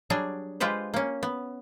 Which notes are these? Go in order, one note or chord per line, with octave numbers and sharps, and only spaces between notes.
F#3 G3 D4 G#4
G#3 F4 G4 B4 C5
A#3 C#4
B3